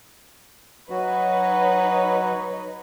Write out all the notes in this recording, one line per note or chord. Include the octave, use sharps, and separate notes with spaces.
F#3 D#4 F#4 B4 C#5